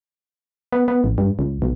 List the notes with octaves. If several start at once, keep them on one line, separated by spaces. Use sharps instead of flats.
B3
B3
A1
G2
C#2
B1